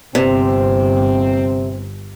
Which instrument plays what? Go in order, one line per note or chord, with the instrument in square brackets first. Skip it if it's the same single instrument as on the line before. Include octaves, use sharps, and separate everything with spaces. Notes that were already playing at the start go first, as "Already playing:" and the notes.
[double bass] G1 [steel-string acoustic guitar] C3 [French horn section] C4